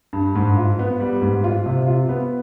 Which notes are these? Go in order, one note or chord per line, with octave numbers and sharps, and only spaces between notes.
G2
G#2
F4
B3
G3
G#2
F4
C3
F4
B3